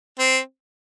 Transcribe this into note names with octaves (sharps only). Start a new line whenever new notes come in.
C4